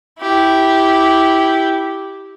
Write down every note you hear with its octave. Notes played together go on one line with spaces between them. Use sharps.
E4 G4